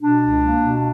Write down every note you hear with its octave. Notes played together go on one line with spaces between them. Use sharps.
B2 D4
C#2
A#3
B2